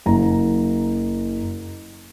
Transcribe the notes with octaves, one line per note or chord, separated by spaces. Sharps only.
F#1 A#5